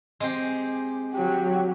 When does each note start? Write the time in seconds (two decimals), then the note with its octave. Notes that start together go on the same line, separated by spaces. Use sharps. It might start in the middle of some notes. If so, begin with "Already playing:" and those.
0.20 G#3 C4 G4
1.13 F#3 G4